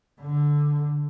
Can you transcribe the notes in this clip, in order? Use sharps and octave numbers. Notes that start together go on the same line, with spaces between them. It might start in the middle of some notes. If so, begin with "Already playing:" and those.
D3